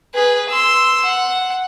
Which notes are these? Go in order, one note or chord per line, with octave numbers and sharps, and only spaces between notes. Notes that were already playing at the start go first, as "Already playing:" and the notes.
G#4 B4
C6 E6
F#5